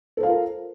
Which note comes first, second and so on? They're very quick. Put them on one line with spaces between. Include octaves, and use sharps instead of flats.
A4 C5 F5 F4 A#4